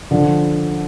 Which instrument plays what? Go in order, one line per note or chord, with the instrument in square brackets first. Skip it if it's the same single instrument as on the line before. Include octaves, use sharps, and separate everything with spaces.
[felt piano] D3 F3